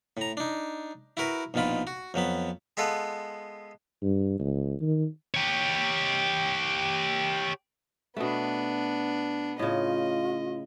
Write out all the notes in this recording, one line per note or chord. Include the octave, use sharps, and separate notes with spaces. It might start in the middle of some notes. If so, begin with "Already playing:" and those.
A2 A#5
D4 D#4
E4 F#4 A#4 B4
A#1 B2 D#3 F4 B5
F#4
F2 F#3 B3 B5
G#3 B3 F4 A4 B4
G2
C#2
D#3
G4 C#5
B2 A3 B3 D4
A2 C#3 F4 D#5